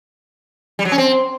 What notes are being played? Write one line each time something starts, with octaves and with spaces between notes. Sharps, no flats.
G3
F#3
C#4
C4